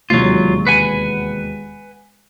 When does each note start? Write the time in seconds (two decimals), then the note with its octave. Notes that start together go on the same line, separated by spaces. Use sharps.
0.10 E1 D#2 C3 F#3 F4
0.67 B4 F#5 G#5